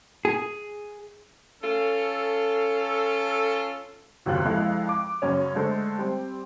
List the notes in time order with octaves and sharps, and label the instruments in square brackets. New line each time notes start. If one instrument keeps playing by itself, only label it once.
[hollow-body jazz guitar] G#4
[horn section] C#4 F4 A4
[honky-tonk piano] F#1 D#2 C3 F#3 F4 F#6
F2 G#3 E4 A4 F5
D6
F#2 C#3 C#4
D3 G#3 A3 A4 C5
G3 C4